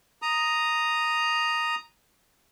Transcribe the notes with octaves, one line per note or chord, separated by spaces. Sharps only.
A#5 D#6